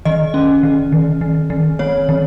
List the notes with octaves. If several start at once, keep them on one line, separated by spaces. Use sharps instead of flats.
D#3 D#5
C#4
D#3
D#3
D#3
D#3
C4 C#5
D#3